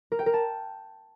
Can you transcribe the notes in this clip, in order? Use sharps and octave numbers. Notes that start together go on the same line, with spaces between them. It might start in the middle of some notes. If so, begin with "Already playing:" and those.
A#4
G5
A#4
A5